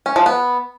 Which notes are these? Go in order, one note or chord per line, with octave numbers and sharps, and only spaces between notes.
C#4
F3
B3